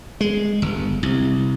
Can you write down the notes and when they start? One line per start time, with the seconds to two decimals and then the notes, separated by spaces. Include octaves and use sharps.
0.21 G#3
0.62 G1
1.03 C2